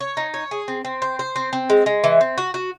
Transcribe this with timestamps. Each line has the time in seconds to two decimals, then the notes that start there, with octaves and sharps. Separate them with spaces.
0.01 C#5
0.17 D#4
0.34 C#5
0.51 G#4
0.68 C4
0.85 C4
1.02 C5
1.19 C5
1.36 C4
1.53 C4
1.70 G#3
1.86 G#3
2.04 E3
2.21 C4
2.38 F#4
2.54 F#4